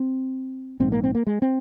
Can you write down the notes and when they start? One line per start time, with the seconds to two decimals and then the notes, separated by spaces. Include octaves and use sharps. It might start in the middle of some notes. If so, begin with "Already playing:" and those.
Already playing: C4
0.80 A#1 G#2 C4
0.92 A#3
1.04 C4
1.15 A#3
1.27 G#3
1.42 C4